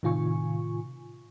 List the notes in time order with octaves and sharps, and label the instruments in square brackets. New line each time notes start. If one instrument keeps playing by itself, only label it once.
[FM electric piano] A2 C3 D#3 F4 G#5 C#6